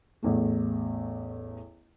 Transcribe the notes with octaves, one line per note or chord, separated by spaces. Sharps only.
A1 E2 A3